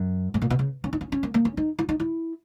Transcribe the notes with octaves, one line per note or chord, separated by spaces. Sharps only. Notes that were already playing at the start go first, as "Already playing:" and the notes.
Already playing: F#2
G#2
A#2
B2
C#3
C#4
D#4
C#4
C#4
A#3
A#3
C#4
D#4
E4
D#4
E4